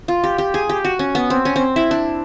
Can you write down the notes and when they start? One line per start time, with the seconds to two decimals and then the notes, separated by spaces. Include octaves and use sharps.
0.08 F4
0.24 G4
0.38 G4
0.54 G#4
0.69 G4
0.85 F#4
0.99 C#4
1.15 B3
1.30 C4
1.45 C#4
1.56 C4
1.76 E4
1.91 D4